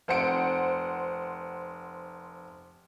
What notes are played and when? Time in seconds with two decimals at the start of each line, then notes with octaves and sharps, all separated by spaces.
0.08 F1 C5 F#5 C#7 D7